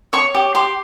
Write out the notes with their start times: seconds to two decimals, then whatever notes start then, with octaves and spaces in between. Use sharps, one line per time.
0.13 C#5 C#6
0.35 G4
0.55 G4 C6